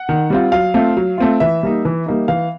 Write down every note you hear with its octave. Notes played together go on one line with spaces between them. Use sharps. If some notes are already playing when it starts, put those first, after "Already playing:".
Already playing: F#5
D#3
G3 C4 F4
F#3 F5
A3 C4 F4
F#3
A3 C4 F4
E3 E5
G3 A#3 D#4
E3
G3 A#3 D#4
E3 F5